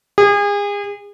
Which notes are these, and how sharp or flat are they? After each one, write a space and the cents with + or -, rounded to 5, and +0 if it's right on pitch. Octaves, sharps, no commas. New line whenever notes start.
G#4 -35